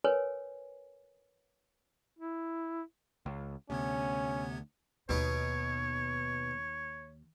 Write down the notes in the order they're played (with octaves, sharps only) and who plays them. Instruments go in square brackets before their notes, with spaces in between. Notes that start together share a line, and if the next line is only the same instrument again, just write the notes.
[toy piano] A#4 B4 C#5 G#5
[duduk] E4
[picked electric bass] C#2
[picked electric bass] D2 [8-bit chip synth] C3 B3 G#6 [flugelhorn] C#4
[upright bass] D#2 D#3 [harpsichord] B2 D#4 [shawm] C#5